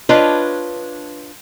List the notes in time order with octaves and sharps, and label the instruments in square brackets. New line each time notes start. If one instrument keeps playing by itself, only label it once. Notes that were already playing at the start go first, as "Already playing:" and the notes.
[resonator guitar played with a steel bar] D4 F4 B4 C#5 D#5